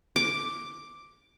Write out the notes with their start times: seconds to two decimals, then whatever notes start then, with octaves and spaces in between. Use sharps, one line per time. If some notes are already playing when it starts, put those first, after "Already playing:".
0.16 D6